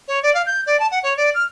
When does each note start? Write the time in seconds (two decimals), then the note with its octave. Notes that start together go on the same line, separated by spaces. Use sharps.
0.08 C#5
0.23 D5
0.34 F5
0.46 G6
0.67 D5
0.80 A5
0.91 F#5
1.03 C#5
1.17 D5
1.35 F6